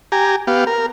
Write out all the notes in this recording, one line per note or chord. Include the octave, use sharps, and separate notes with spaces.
G4 G#5 A#5
B3 G4 F5
A#4